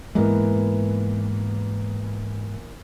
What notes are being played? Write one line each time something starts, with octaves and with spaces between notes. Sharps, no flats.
G#2 E3 G#3 A#3 B3